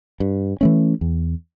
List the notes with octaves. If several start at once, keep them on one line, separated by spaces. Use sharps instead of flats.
G2
E3 A3 C#4
E2